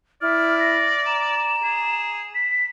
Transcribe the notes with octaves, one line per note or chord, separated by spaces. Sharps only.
E4 D5 F6
A#6
A#5 E7
G#4
B6